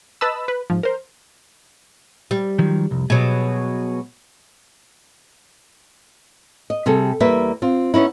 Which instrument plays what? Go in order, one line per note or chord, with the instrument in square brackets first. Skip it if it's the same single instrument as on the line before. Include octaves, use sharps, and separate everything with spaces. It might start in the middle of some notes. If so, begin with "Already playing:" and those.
[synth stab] B4 D#5 A5 B5 E6
B4
G#2 F3
A#4 C5
[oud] G3
[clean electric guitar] D#3 F3 F#3
C2 F2
[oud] B2 F#3 [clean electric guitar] G#4 C#5
[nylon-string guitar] D#5
C3 G3 G#4 A4
E2 G3 A#3 B4 E5
C4 F4
B3 C#4 D#4 E4